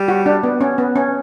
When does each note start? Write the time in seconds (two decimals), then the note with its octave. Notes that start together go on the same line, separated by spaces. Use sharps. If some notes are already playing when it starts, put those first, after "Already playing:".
Already playing: G3
0.08 F#4
0.26 D4
0.43 B3
0.61 C#4
0.78 B3
0.96 C#4